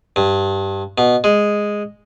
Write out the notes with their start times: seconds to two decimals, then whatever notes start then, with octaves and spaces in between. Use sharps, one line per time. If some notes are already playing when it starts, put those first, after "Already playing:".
0.16 G2
0.98 B2
1.24 G#3